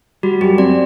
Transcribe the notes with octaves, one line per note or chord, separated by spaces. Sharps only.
G3 F#4
F#2 G4
C4 D5